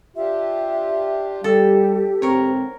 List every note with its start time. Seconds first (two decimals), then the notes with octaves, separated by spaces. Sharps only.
0.16 D4 F4 G4 E5
1.44 G3 G4 A4
2.22 G#2 D3 C4 A#4 C#5